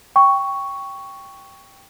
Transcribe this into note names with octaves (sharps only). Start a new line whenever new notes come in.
G5 C#6